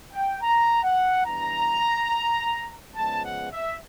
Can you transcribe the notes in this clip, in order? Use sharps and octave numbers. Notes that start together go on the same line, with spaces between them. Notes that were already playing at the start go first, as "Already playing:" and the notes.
G5
A#5
F#5
E3 G3 B3 D4 A#5
C#3 F3 G#3 B3 A5
F#5
E5